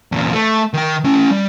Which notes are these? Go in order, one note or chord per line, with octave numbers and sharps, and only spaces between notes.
E2 A#2
A3
D#3 G5
A3 C#4
G3